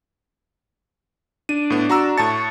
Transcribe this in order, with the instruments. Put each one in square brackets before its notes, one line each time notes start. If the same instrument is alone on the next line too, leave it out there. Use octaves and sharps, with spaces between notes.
[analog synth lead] D4 [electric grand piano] D#7
[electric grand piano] A2 B3
F#4 A#5 E6
[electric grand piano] A2 A5 A6 [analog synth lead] C#6